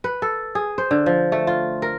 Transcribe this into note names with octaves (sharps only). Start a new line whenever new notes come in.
B4
A4
G#4
C5
D3
F3
A3
F4
A#4